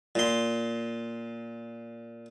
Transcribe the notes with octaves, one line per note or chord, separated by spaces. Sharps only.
A#2 C6